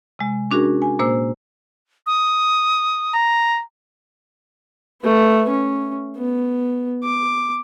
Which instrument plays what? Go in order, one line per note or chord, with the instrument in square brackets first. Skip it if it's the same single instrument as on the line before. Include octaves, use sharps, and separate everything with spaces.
[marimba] C3 G#3
C#4 D4 F#4 G#4 A#4
G#5
A#2 A#3 C5 E6
[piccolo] D#6
[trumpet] A#5
[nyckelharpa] A3 B4
C#4
B3
D6